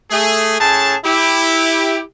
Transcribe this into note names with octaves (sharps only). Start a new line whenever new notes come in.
A3 G#4
A2 C#4 G#4 A5
E4 G4